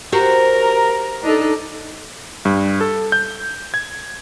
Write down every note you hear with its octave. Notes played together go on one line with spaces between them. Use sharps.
F#4 G4 A#4 C5
D4 D#4 A4
G2
A4
G6
G#6